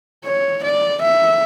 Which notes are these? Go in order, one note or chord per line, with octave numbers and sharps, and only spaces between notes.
C#5
D5
E5